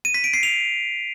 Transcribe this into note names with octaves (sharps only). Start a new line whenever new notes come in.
D#7
B6
D7
C7
F7